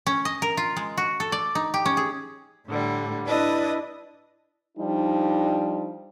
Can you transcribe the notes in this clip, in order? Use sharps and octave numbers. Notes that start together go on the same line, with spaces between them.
C#4
D#5
A#4
F4
G#3
F#4
A4
D5
D#4
G4
C#4
G#4
A2 D3 G3
D4 E4 B4 D#5
F3 G3 D4 D#4